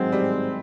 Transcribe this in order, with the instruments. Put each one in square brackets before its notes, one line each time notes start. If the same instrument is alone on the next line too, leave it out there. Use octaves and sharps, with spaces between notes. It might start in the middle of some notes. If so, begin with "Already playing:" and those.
Already playing: [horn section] G#2 D#3 G#3 C4 [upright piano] F#3
[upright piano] G3